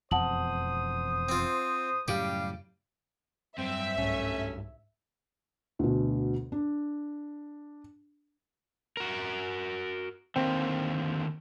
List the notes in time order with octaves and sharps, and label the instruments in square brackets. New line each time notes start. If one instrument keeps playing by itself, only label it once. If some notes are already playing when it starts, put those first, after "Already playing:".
[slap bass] E1 F2 [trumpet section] C5 D#6 [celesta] F#5 A5 F#7
[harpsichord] C4 F4
[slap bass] F#2 A2 C#3 [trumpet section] G3 F5 [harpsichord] G4
[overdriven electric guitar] G2 F#3 [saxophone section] C4 [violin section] E5
[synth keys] C2 G#2 [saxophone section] A3 C#4
[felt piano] D2 B2
D4
[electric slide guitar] F#4 A#4
[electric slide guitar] D3 D#3 A#3 [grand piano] C4